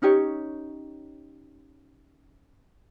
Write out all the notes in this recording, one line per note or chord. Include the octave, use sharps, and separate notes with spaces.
C#4 D#4 G4 C#5